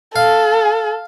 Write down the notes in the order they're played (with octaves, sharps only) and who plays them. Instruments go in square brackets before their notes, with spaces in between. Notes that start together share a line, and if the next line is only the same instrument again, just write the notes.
[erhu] A4 [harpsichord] F5